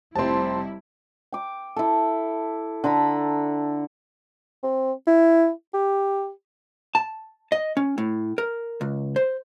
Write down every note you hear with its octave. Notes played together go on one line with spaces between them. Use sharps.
F1 C3 G3 C4 E4 A5 C6
G5 D6
E4 A4
D3 A4 A#5 B5
C4
E4
G4
A5
D#5
C#4
A2
A#4
C#2
C5